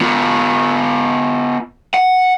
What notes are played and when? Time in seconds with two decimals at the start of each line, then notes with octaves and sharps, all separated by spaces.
0.01 B3 F4
1.94 F#5